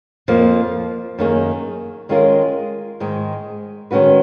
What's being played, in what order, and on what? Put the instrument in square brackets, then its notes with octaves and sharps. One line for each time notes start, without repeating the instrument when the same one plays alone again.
[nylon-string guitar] F2 F3 A#3
F#2 D#3 A#3 D#4 G#4
D#3 G#3 C#4 F4 A#4
G#2 D#3 G#3
D#3 G#3 C#4 F#4 B4